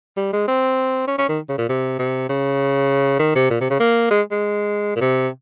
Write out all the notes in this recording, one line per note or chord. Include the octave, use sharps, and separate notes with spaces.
G3
G#3
C4
C#4
C#4
D#3
C#3
A#2
C3
C3
C#3
D#3
C3
A#2
C3
C#3
A#3
G#3
G#3
A#2
C3